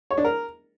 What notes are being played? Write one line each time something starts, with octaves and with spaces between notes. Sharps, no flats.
C#5
D4
A#4